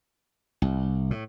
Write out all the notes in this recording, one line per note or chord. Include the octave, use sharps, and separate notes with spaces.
C2
A2